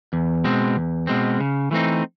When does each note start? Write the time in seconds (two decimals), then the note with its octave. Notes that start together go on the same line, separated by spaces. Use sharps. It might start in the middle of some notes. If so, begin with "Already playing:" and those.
0.13 E2
0.44 B2 G#3 C4
0.77 E2
1.07 B2 G#3 C4
1.40 C#3
1.71 E3 A3 C4 D#4